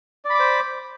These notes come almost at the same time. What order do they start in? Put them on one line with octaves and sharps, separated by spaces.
D5 B5 D6 C5